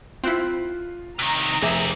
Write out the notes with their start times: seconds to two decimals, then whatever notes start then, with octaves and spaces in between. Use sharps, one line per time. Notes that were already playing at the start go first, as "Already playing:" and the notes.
0.24 C4 E4 F4 F#6 C7
1.19 C3 D#3 A#5
1.62 F1 G4 G#4 A#4 E5 D6